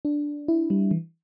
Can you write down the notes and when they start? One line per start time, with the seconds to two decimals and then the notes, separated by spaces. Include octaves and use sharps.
0.05 D4
0.48 E4
0.70 G3
0.91 E3